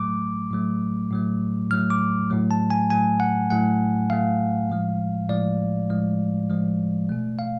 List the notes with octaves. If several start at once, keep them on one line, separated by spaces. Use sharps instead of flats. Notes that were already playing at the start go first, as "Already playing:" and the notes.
Already playing: A2 F#3 A3 D6
A2 F#3 A3
A2 F#3 A3
A2 F#3 A3 F6
D6
A2 F#3 A3
A5
G#5
A2 F#3 A3 G#5
F#5
A2 F#3 A3 F#5
A2 F#3 A3 F5
A2 F3 G#3
A2 F3 G#3 D5
A2 F3 G#3
A2 F3 G#3
B2 A3
F5